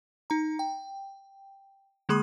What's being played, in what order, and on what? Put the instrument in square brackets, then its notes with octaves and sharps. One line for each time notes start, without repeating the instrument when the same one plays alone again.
[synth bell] D#4 A#5
G5
D3 G#3 A#3 G#4 B5 D#6